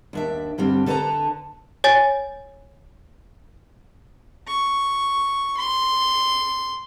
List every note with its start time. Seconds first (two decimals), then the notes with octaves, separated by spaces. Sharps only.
0.13 D#2 D4 E5
0.58 G2 D3 G3 C4
0.86 D3 A4 B4 C#5 A5 A#5
1.84 C#5 G#5 A6
4.47 C#6
5.57 C6